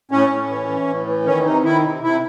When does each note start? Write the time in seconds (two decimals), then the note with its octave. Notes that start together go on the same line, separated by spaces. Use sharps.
0.11 A2 C#4
0.30 A2
0.49 E3
0.68 E3
0.87 A2
1.07 E3
1.26 D#3 C#4
1.45 C3 D#4
1.64 D#3 E4
1.84 C3
2.03 C3 E4